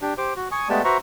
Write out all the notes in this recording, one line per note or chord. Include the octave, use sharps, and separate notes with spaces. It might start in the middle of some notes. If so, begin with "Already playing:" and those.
D4 G4
G4 C5 D6
F#4
G#5 C#6 D#6
G#3 A3 B3 G4 D5 A5
F#4 B4 C5 E5 A#5 C#6